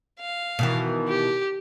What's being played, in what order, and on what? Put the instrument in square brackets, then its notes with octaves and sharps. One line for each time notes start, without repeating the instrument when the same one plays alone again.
[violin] F5
[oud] B2 D#3 E3
[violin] G4